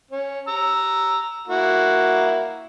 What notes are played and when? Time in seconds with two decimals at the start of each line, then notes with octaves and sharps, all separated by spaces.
0.11 C#4
0.48 A#5 E6
1.48 A#3 E4 F#4